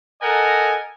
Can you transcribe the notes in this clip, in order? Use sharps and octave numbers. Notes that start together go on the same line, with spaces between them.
A4 A#4 D#5 F#5 G#5 A#5